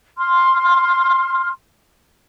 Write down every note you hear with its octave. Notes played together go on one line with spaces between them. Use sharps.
C6 F6